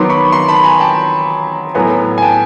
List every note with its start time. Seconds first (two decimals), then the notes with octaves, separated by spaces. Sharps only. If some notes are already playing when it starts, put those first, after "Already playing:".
Already playing: D#3 F#3 B3 C6 D6
0.10 B5 C#6
0.32 A#5 C6
0.48 A5 B5
0.64 G#5 A#5
0.80 G5 A5
1.74 A2 F#3 B3 G#5 A#5
2.18 G#5
2.22 G5 A5